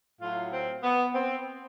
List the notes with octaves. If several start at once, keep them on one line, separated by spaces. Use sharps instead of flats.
A2 F#3 F4
C4
B3
C4